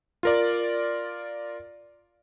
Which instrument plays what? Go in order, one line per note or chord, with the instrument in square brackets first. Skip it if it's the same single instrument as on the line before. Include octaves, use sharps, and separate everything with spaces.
[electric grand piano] F4 A#4 D5